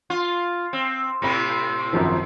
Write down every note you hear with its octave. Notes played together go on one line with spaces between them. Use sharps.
F4
C4
A2 C3 C4 B5 A#6
G#1 F#2 F3